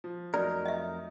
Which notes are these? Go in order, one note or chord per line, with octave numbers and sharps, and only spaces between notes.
F3
F2 F#3 A3 D#4 A#4 D5
D#5 E5